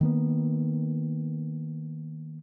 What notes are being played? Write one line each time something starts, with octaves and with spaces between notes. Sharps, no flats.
D#3 A#3 B3